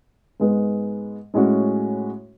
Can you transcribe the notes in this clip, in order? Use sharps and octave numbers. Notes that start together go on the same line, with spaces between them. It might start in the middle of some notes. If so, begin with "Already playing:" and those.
G#2 G#3 B3
A2 G#3 C#4 F#4